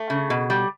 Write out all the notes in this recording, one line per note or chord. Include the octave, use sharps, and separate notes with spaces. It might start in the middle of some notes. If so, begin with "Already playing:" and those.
Already playing: A3
C#3
B2
G3